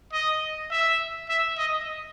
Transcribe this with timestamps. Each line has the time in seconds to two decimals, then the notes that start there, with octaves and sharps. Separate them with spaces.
0.12 D#5
0.71 E5
1.29 E5
1.58 D#5